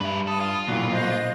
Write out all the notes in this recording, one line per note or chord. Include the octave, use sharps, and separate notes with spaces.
G2 G#3 B4 E5
A4 B5 D#6
F4
B1 A#2 E4 F#4 G4
C5 D#5 F#6